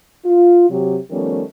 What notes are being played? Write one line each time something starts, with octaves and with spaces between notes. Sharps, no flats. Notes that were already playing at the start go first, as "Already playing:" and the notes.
F4
C3 F#3 G4
D#3 F3 G3 A3 B3 C#4